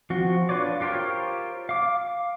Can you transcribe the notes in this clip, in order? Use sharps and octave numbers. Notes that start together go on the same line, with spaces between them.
F3 C4 F#4
D4 F4 B4 C#5 D5
F4 G4 A#4 C5 C#5
F5 D6